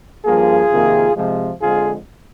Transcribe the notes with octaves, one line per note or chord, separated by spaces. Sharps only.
G2 F3 A#3 F4 G#4
F2 C3 D#3 A#3
C3 F3 G#3
F2 D3 F3 G#3 F4 G#4